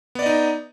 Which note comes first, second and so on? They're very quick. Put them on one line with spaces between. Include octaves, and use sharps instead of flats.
B3 D5 D#5 D#4